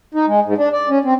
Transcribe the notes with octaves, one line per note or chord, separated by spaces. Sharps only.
D#4
G#3
G#2
D4
D5
C#4
C4